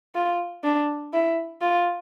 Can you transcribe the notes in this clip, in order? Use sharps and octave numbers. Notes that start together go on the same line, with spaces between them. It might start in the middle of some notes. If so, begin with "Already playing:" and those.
F4
D4
E4
F4